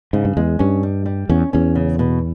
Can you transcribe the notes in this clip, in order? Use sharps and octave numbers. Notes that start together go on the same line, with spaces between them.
G#2 C#3
G2
E2 G#3
G2 C#4
G3
G3
E2 C#4
E2 C#4
C#3
B2